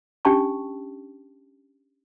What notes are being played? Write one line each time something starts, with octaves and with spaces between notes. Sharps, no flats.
C#4 D4 G4 G5 A5 C#6